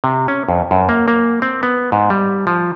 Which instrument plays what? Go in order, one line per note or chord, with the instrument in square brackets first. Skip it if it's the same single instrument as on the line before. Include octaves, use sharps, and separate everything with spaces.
[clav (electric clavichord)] C3
C#4
F2
F#2
A#3
A#3
C4
B3
G#2
G3
F3